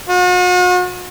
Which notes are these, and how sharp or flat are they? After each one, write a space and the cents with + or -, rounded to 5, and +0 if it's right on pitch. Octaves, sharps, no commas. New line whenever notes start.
F#4 -45